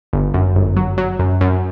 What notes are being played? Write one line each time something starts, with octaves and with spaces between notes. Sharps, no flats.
G1
F#2
G1
F#3
F#3
F#2
F#2